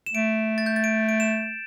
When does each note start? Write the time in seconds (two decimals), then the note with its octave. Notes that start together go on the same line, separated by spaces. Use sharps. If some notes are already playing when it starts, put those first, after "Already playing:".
0.06 E7
0.14 A3 D7
0.58 A6
0.66 G6
0.76 A6
0.84 D7
1.09 D7
1.20 E7